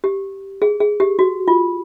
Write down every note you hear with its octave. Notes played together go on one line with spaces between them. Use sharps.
G4
G#4
G#4
G4
F#4
F4